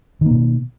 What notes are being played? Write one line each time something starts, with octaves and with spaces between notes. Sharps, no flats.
B2 D#3 A#3